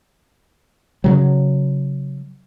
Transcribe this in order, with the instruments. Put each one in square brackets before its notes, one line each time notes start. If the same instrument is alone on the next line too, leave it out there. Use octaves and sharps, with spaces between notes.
[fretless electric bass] C#3 F#3